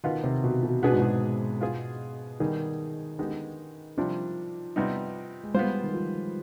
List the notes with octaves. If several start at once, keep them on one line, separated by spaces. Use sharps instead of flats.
B2 D#3 B3 F4
C3
B2
B2
B2 B3 D4 G#4 B4
G#2
B2
B3 F4 G#4
D#3 G3 B3 D#4 G#4
D3 G#3 B3 D#4 G4
C3 F3 G3 D4
C3 G3 B3 D#4
G#3
G3 B3 F4 C5
D#3
F3